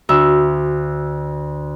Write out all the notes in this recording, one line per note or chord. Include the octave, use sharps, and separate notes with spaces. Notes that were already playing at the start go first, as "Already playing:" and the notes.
D2 E5